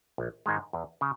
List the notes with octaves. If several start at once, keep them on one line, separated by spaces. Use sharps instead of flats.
A#1
G#2 D#3 G#3
E2
C#3